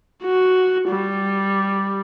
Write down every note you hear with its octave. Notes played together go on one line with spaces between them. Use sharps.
F#4
G3